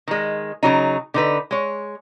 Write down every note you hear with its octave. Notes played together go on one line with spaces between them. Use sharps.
D#3 G#3
C#3 F#3 D#4
D3 D#4 B4
G#3 C#5